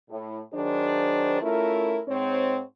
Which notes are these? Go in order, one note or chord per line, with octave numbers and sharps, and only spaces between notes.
A2
D#3 F#3 D4 G#4 C5
A3 C#4 E4 F4 A#4
G#2 C4 C#5